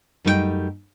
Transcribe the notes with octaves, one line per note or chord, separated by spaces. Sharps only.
F#2 G3 A3 D#4 G4 G5